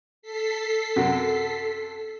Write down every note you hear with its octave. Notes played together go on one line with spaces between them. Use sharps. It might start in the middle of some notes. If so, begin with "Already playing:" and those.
A4 B6 C7
F#2 C3